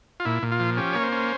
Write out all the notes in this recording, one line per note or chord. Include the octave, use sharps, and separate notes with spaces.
F4
A#2 E4
A#2
F4
F3
C#4 G4
A#3 C#5
C5
C#4